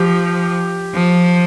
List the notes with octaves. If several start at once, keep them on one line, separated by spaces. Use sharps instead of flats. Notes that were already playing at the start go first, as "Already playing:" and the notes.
Already playing: F3 G4
F3